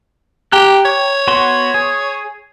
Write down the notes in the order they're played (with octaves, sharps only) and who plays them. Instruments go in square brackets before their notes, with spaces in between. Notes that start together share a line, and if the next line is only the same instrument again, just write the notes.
[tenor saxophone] G4 [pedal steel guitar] G5 A#5 F#6
[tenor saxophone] C#5
[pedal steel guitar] B3 F#4 C6
G#4